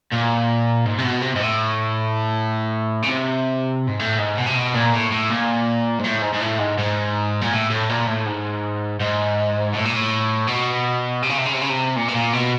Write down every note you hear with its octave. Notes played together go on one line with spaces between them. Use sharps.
A#2
G#2
C3
B2
C3
G#2
A2
C#3
C3
G#2
A2
G#2
B2
C3
B2
A#2
A2
A2
A#2
G#2
A2
G#2
G#2
A2
G#2
G#2
A#2
A2
A2
A#2
A2
G#2
G#2
A2
A#2
A2
B2
C3
C#3
C3
C#3
C3
C#3
C3
A#2
B2
A#2
B2